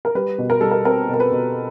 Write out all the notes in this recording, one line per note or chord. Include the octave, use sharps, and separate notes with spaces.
A#4
G3 B4
B2
A#4
G3 A4
A#4
C4 A#4
B2
A#4
B4
B2